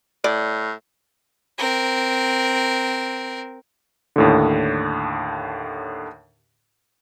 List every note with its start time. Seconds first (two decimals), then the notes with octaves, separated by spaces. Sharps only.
0.24 A2 D5
1.58 C4 A#4
4.16 D#2 A2 D3